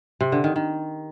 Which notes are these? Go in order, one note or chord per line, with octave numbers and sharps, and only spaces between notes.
C3
D3
D#3
D#3